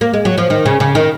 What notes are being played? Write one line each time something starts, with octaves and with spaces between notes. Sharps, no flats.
A#3
G#3
F#3
F3
D#3
C#3
C#3
D#3